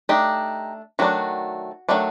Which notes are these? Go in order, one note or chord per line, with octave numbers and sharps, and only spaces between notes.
A3 D4 D#4 G4
D#3 F#3 A3 D4 F#4
D#3 F#3 A3 D4